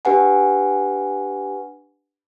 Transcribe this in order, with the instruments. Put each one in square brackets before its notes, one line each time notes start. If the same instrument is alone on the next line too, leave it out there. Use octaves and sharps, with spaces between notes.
[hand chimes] D4 G4 B4 F#5 G#5